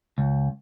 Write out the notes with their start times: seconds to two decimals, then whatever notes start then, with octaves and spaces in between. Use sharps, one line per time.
0.18 C#2